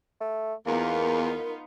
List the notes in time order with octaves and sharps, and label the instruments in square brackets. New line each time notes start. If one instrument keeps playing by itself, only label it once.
[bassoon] A3
[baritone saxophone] E2 [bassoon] A#3 [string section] B3 D#4 F4 [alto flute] A#4